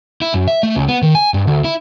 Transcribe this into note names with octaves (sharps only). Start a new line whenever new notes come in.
E4
F#2
E5
A3
C#2
B3
D#3
G#5
G2
D2
E4